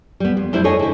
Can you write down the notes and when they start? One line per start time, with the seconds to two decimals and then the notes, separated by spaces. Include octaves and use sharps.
0.20 G3 B3
0.37 F2
0.52 F#3 G3 D4 E4 C5
0.64 G#4 A4 C#5 D#5 G#5
0.79 D3 E4